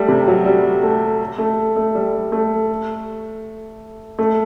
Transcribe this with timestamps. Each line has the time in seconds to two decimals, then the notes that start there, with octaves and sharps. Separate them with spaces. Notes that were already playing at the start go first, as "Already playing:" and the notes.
Already playing: G3 A3
0.08 C3
0.28 F#3
0.45 G3
0.83 A3
1.38 A3
1.76 A3
1.95 G3
2.32 A3
4.19 A3